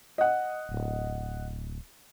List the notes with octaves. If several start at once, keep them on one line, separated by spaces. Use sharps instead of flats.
D#5 F#5
D1